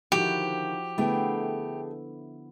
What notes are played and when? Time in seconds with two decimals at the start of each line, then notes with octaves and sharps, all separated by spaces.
0.12 D3 D#3 F3 E4 F#4 G4
0.98 D3 A3 B3 E4 G#4 G5